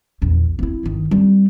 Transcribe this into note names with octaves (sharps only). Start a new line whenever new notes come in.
A#1 E2
C4 E4
G1 D#3
G3 C4